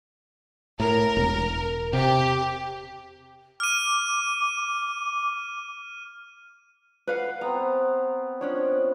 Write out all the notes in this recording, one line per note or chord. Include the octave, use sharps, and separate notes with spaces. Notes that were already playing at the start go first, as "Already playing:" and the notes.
A2 A#4
E1
C3 G4
D6 F6 D#7
B4 F5 F#5
B3 C4 A#5
F3 C#4 D4 C#5